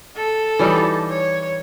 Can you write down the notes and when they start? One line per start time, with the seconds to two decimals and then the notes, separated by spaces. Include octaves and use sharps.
0.17 A4
0.59 E3 G3 D#4
1.11 C#5